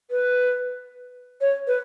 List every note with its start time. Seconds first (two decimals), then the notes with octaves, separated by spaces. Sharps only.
0.11 B4
1.41 C#5
1.67 B4